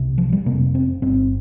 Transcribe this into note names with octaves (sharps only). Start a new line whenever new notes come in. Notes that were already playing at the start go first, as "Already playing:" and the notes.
Already playing: C2 C3
F3
G3
F1 F2 C3 A#3
C4
G1 G2 C4